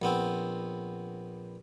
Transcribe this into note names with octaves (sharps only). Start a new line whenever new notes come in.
A#1 B3 C4